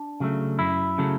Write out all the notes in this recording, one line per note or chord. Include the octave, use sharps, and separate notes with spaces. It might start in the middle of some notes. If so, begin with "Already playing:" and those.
Already playing: D4
C#3 F#3 A3
F#2 E4
C#3 F#3 A3